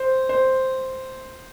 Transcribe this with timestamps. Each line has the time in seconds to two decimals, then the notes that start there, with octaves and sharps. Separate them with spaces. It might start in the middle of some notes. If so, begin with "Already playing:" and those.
Already playing: C5
0.29 C5